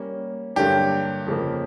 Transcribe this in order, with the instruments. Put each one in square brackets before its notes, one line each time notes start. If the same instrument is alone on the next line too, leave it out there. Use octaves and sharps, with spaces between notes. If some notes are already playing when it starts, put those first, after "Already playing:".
Already playing: [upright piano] G3 A#3 C#4
[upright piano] G2 D3 F#3 A#3 D4 [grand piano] G4
[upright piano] F2 C#3 F3 A#3